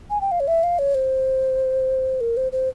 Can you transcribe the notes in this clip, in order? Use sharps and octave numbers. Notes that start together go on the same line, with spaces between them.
G#5
G5
F5
C#5
E5
F5
C#5
C5
A#4
C5
C5